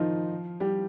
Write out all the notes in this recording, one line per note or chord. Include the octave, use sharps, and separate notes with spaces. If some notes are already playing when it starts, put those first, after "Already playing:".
Already playing: D#3 F3 D#4 F4
G3 G4